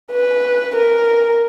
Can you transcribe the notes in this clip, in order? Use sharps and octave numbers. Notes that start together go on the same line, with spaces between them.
B4
A#4